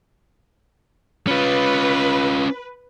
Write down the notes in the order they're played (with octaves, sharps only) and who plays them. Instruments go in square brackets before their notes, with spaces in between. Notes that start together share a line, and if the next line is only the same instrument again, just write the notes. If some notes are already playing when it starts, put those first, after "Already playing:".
[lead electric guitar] C#4 F4 [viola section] B4